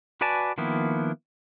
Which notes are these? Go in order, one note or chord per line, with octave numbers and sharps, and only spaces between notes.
F#4 B4 D5 G#5 A5
D#3 F3 A#3 B3 E4